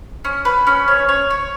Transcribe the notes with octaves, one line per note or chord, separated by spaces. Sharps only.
C#4
B4
C#4
C#5
C#5
C#5